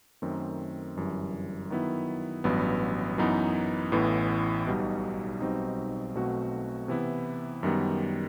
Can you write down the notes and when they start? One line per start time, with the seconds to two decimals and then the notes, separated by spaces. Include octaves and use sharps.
0.22 F#2 D#3 A3 C4
0.96 G1 F#2 E3 G3
1.70 D#3 F#3 B3 E4
2.44 A1 G2 F#3 B3
3.18 F#2 E3 B3 D#4
3.92 A1 A2 E3 B3
4.67 B1 B2 G3 D#4
5.40 B1 B2 G3 C4 D#4
6.15 B1 B2 A3 C4 F#4
6.88 C3 E3 B3 E4
7.63 F#2 D#3 G3 B3